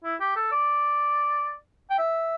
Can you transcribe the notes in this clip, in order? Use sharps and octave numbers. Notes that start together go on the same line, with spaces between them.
E4
G4
A4
D5
G5
E5